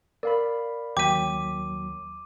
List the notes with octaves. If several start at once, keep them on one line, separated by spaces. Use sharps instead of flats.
A#4 D5 F5 B5
D#2 F#3 G5 D6 B6 D#7